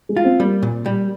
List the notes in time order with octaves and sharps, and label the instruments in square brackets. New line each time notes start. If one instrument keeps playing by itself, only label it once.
[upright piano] G#3
[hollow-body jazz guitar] F4
[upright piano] C4
[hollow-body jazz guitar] G3 [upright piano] A#3
[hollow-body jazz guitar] A#2
G3